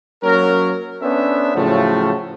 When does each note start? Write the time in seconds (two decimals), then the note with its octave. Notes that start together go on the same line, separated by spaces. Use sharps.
0.23 F#3 A#3 C#4 A#4
1.02 B3 C#4 D4 A4 C5 E5
1.55 A2 C#3 F3 F#3 A3